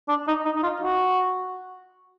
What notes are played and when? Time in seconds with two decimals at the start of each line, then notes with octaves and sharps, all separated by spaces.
0.09 D4
0.28 D#4
0.45 D#4
0.56 D#4
0.63 F4
0.82 F#4